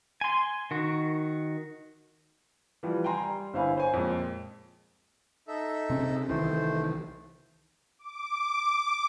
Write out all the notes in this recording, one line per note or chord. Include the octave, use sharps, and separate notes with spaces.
G#5 C6
D#3 F#4
E3 F3 G3
G5 G#5 A#5 C6
G3
G1 E4 C5 F5 G#5 B5
C5 C#5 G#5
F2 A#2 G#3
D#4 A4 E5
C3 C4 C#4
C2 D#3 E3 A3 C5
D6